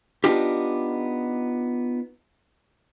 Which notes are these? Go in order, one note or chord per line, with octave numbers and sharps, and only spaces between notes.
B3 D4 D#4 F4 G4